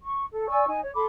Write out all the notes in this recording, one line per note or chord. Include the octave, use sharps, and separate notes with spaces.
C#6
A4
D5 G#5 C#6 E6
D#4 G#5
C#5
A4 B5 C6 D6